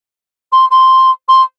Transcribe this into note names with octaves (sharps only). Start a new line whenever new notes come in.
C6
C6
C6